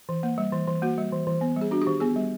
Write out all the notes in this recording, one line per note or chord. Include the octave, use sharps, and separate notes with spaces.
E3
A#3
G3
E3
E3
A#3 F#4
G3
E3
E3
B3
G3 G#4
D4 F#4
G4
D#3
B3 G#4
G3